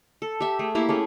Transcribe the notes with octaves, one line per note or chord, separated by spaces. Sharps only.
A4
G4 E5
A3 G#4
A#3 E4 G4
A3 C#4 G#4